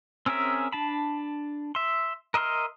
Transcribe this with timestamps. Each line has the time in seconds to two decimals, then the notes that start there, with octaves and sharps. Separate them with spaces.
0.26 C4 C#4 G#4 A#4 E5
0.73 D4 A5 B5
1.75 E5 C6
2.34 A#4 D#5 E5 C6 F6